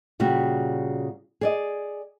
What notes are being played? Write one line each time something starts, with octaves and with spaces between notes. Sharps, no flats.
A#2 C#3 G3 F#4
G#4 D5 D#5